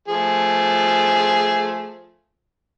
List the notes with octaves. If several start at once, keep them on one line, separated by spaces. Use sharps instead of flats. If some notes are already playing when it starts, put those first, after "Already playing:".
F3 A3 G#4